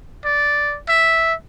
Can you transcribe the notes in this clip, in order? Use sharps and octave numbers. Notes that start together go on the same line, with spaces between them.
D5
E5